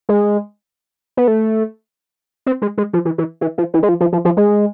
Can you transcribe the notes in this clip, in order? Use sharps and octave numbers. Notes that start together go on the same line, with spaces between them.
G#3
B3
A3
C4
G#3
G#3
F3
E3
E3
E3
F3
E3
G#3
F3
F3
F3
F3
G#3